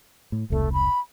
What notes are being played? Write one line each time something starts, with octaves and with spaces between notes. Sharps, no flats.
A2
E1 C2 A3
B5